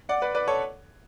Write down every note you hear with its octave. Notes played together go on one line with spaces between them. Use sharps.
D5 F#5
B4 D5
B4 D5
A4 C#5